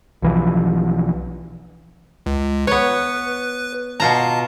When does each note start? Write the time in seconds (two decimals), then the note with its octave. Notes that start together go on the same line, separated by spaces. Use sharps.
0.22 B1 E3 F3
2.26 C#2
2.67 B3 B4 C#5
4.00 B2 F4 A5 A#5